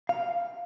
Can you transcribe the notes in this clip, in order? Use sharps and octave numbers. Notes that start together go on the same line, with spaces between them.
F5